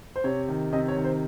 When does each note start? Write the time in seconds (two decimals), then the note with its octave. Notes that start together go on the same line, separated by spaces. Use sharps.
0.16 C5
0.24 C3 C#5
0.48 D#3
0.72 C3 D#5
0.88 C#5
0.97 D#3
1.04 C5